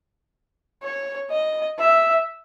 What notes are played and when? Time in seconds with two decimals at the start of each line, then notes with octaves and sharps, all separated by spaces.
0.83 C#5
1.31 D#5
1.79 E5